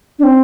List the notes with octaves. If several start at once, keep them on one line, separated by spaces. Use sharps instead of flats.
D4
C4